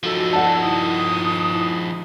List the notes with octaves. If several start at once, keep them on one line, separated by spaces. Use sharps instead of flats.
F3 D#4 F#4 A4
D5 F#5 A5
E4 D#6